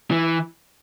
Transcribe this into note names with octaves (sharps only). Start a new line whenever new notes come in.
E3